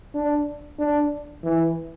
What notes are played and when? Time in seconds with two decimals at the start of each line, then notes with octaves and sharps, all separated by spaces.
0.15 D4
0.79 D4
1.44 E3